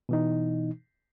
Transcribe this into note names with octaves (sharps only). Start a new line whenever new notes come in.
B2 E3 D#4